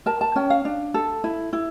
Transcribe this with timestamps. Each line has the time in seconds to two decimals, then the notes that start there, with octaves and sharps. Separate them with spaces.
0.06 A#4 A5
0.21 A5
0.36 C#4 G5
0.50 F5
0.65 D4
0.94 A4
1.24 E4
1.53 E4